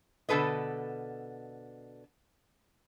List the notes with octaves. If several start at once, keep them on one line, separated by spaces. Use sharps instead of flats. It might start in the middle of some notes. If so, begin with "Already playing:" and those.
B2 D3 A4 B4 D#5